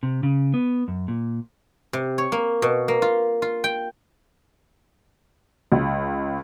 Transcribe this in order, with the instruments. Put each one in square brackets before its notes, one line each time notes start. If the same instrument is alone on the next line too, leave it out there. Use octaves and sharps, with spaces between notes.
[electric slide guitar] C3
C#3
B3
F#2
A#2
[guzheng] C3
C#5
A#3
B2
A#3
F4
F4
G5
[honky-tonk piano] C#2